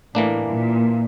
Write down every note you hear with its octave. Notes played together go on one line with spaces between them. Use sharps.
A2 E3 A#3 D4
A#2